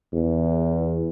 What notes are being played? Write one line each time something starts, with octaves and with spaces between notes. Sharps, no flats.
E2